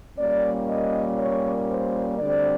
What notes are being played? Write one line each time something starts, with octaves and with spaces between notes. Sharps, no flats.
A#2 G3 A#3 C#4 D5
D#5
C#5
C5
D2 D3 G3 C4 D5